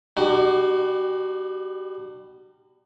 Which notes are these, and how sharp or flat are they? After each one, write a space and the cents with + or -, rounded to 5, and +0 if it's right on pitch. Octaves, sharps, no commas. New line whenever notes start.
G3 +20 D#4 -45 F#4 +30